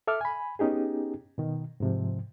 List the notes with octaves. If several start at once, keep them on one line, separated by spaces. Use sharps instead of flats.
A4 E5 D6 F6
G#5 B5
B3 C#4 D#4 G4 G#4
B2 D#3
G#2 C3 F3